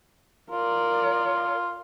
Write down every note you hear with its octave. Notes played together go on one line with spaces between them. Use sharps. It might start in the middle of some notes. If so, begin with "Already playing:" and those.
F4 A#4 D5